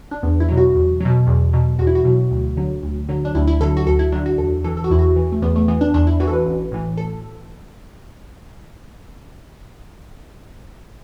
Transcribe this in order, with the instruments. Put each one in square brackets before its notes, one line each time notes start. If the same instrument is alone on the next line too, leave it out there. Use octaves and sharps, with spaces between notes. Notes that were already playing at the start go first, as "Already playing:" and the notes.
[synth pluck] D4
E2 B3
E4
B2 F#3
F#4
E2
B2 F#3
E2
B2 F#3
E2 F#4
E4
F#4
B2 F#3
D2
D3 F#3
D2
D3 F#3
D4
D2 E4
E4
D3 F#3 A4
F#4
D2 A4
E4
D3 F#3 D4
F#4
E2 A4
E3 A4
A4
F#4
E2 E4
F#4
E3
A3
E2 B3
A3
E3 B3
D4
E2 D4
E4
E3 F#4
A4
B4
A1
A2 E3
A4